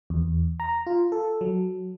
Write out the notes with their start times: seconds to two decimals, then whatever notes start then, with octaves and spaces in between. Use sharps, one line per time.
0.10 E2
0.60 A#5
0.87 F4
1.12 A4
1.41 F#3